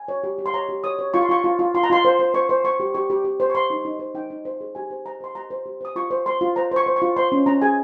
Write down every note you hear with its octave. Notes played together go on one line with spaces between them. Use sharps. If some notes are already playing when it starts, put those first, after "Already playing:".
Already playing: G#5
C#5
G4
G4
C6
C#5 A#5
G4
C#5 D#6
C#5
F4 C#6
C6
F4 C#6
F4
F4
F4 C6
A#5
F4 C6
C5
C5
C5 C#6
C5
C5 C#6
G4
G4 C#6
G4
G4
C5
C#6
C5 C6
D#4
D#4
C5
D#4 G5
D#4
C5
G#4
G4 G#5
C5
C5 A#5
C5 C6
G4 A#5
C5
G4
C5 D#6
F4 C#6
C5
C5 C6
F4
C5 A#5
C5 C#6
C5
C#6
F4
C5 C6
C#4
C#4 A#5
G#4 G#5